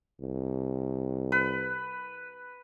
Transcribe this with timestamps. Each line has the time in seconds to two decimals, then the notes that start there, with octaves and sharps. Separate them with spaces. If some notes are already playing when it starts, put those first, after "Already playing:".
0.21 C2
1.32 B4